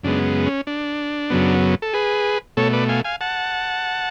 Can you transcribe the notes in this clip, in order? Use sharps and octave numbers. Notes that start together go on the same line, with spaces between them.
F#2 C#3 G#3 B3 D4
C#4
D4
F#2 C#3 F#3 B3
A4
G#4 B4
B2 A3 A4 C#5
B4 D5
F5 G#5
F5 G#5
F#5 A5